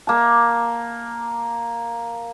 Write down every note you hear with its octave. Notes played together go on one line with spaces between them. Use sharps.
A#3 A5